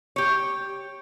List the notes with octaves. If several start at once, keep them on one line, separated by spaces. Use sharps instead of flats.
G4 C#5